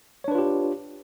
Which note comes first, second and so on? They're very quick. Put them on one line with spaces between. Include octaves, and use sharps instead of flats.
C#5 D4 B4 F4 G4